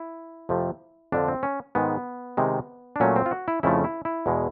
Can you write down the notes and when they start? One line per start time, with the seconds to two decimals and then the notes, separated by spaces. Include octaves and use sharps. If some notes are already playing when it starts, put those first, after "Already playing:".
Already playing: E4
0.49 F2 C3 F3 A3
1.12 F2 D3 F3 D4
1.28 C4
1.43 C#4
1.75 G#2 D#3 G#3 B3
2.37 C3 D#3 G#3
2.96 D4
3.00 A#2 F#3 A3 C#4
3.16 C4
3.26 F4
3.31 F#4
3.48 E4
3.63 F2 C#3 F3 A3 E4
3.84 E4
4.05 E4
4.26 E2 B2 G#3